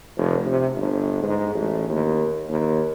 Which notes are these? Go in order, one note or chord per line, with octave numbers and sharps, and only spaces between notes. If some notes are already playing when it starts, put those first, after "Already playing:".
F1
C3
G1
G#2
A1
D#2
D#2